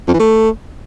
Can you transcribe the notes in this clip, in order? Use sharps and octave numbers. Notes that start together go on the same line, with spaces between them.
F2
E3
A3